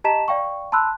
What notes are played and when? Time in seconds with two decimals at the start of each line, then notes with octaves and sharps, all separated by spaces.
0.04 G4 D#5 A5 A#5 B6 E7
0.28 D5 F5 G5 C#6
0.72 A5 B5 C6 E6 F#6